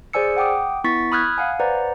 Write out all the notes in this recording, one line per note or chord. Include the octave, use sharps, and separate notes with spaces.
G#4 C5 D5 G#5 E6 C#7
F#5 G5 D6 D#6
B3 E4 C#6 A6 B6
B5 D#6 F6 F#6 G#6
F5 F#5 G#5
B4 C5 D5 F#5 A#5